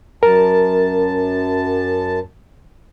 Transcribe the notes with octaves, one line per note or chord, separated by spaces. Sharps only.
F#2 A#4 A5